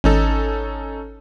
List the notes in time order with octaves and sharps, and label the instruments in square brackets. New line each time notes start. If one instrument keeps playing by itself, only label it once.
[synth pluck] G#1 [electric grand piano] C#4 D#4 A4